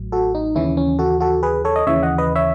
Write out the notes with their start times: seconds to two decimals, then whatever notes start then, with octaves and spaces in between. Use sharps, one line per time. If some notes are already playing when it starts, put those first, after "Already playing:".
Already playing: A1 A2 F#3
0.12 F#4 A4
0.35 D#4
0.55 D#2 C#3 E3 C#4 E4
0.77 C#4
0.99 F#4 A4
1.20 F#4 A4
1.43 G#4 B4
1.65 A4 C#5
1.76 D#5
1.87 D#2 C#3 E3 C#5 E5
2.03 D#5 F#5
2.18 B4 D#5
2.36 C#5 E5